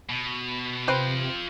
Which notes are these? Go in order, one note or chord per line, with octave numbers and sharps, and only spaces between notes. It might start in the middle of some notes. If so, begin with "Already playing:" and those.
B2
C3 C4 F4 B4 G5 C6